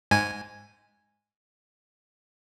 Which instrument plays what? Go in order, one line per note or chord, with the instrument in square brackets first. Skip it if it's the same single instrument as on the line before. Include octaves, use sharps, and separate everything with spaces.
[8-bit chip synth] G#2 G#5